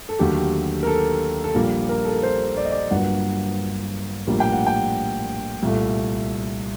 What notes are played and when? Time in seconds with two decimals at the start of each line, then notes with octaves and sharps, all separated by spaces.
0.09 A4
0.19 D#2 D3 F#3 A3 G4
0.83 A#4
0.87 A4
1.44 A4
1.55 A#1 A#2 G3 A#3 A#4
1.89 A#4
2.05 A4
2.13 A#4
2.23 C5
2.57 D5
2.65 D#5
2.72 D5
2.90 G1 G2 F#3 A#3 F#5
4.27 A#1 A2 G3 A#3
4.40 G5
4.52 F#5
4.67 G5
5.63 C2 A#2 A3